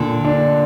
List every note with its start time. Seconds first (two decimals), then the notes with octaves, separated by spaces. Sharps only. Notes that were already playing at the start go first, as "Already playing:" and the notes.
Already playing: A#2 D3
0.25 D4